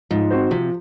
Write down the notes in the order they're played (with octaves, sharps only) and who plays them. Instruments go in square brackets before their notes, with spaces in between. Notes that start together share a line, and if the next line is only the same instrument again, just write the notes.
[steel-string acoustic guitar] G#2 [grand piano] F3
[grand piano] C4 F#4 C5
[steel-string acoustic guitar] C3 [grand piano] F3